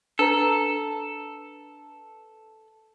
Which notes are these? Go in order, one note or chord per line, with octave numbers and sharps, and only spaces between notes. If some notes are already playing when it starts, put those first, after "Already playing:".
D4 A4 B4 A#5